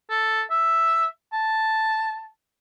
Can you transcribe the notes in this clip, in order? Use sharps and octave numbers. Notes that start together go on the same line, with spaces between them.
A4
E5
A5